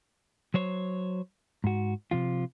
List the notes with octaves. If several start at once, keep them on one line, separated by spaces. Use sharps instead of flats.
F#3 C5 C#5
G#2 F#4
C3 F3 F4